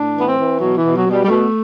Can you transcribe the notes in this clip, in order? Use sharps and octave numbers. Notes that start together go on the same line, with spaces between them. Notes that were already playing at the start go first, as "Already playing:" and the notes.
Already playing: A2 D4
E3
B3
C4
E3
B2 F#3
E3
B2
F#3
B2 G3
G3
B2 A3